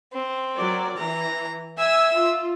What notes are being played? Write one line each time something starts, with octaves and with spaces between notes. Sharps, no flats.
C4
F#3 A#4 D5
E3 A#5
E5 G#5 E6
F4